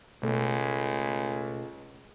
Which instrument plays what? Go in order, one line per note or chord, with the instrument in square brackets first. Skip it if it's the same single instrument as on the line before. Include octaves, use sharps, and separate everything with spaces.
[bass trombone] C#2 [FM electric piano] B2 A3 A4